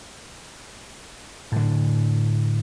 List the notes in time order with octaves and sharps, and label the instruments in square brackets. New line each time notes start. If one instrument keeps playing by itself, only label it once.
[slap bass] A2 D3